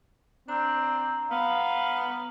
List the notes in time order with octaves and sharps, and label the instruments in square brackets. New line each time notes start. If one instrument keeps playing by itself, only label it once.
[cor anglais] C4 [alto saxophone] D4 [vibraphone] A#5
[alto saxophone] B3 [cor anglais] F5